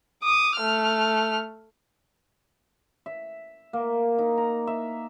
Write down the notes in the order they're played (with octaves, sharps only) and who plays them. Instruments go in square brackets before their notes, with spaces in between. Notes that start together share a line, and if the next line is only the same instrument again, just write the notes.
[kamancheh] D6 D#6
A3 F6
[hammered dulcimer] E5
A#3
D#4
A#5
E5